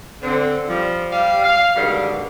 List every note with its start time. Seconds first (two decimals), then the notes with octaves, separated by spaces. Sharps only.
0.21 D3 C4
0.69 F3 G3
1.11 G3 F5
1.44 F5
1.76 G2 B2 D3 D#3 G3 G#3